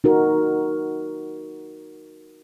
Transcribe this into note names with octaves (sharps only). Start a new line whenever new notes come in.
D#4 F#4 A#4